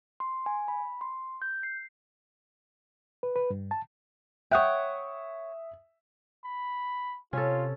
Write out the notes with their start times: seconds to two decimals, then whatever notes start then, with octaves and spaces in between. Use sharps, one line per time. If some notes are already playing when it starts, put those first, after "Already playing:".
0.20 C6
0.46 G#5
0.68 B5
1.01 C6
1.42 G6
1.63 C7
3.23 B4
3.36 B4
3.50 G2
3.71 A5
4.51 C#5 E5 F#5 G5 D#6
6.46 B5
7.33 C3 C#4 F4 A4